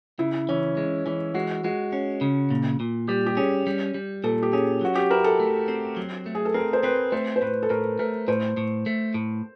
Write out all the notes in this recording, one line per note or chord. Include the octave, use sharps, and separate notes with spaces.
C#3 E4
E3 C#4
G#3
E3 C#4
G#3 F#4
G#3 F#4
C#4
C#3
A#2
A#2
G3 G4
G4
C#4 G#4
G3
G3
A#2 A4
G4
C#4 G#4
F#3 F#4
G4
E4 A#4
A4
A3
C4
F#3
A3
G#4
A4
C4 A#4
C5
C4 B4
A3 C5
C5
A2 B4
A4
A2 A#4
A3 A#4
A2 C5
A2
A3
A2